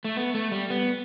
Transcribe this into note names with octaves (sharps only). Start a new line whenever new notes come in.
A3
B3
A3
G3
B3